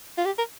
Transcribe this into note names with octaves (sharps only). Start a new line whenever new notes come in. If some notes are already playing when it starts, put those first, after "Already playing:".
F4
G4
A#4